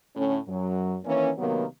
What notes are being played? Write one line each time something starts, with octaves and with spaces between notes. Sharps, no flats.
A2 D3 A3 C#4
F#2 F#3
D#3 E3 A#3 C#4
C3 D#3 F#3 A#3 B3